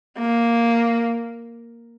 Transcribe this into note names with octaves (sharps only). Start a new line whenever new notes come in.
A#3